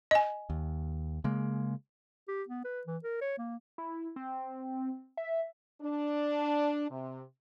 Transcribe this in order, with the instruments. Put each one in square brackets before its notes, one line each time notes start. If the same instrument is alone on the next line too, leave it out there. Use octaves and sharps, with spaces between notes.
[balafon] D#5 G#5
[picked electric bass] D#2
C#3 G#3 A#3
[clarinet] G4
B3
B4
E3
A#4
C#5
A#3
[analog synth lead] E4
C4
E5
[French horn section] D4
C3